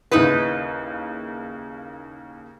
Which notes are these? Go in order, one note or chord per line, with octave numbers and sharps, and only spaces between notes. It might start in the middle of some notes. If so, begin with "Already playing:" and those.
D#2 C#3 D#4 E4 B4